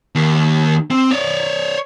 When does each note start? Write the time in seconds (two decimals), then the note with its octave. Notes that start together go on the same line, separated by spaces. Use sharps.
0.15 D#2
0.91 C4
1.11 C#5 D5